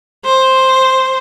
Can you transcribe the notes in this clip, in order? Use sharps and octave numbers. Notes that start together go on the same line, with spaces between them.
C5